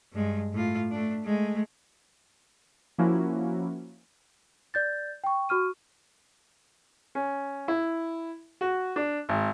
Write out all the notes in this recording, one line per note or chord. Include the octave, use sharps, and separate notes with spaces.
G2 G#3
A2 F4
A3 D4
G#3 A3
F3 A#3 C#4 E4 F#4
D5 G6 A6
G5 C#6
F#4 C#6 F6 D#7
C#4
E4
F#4
D4
G#1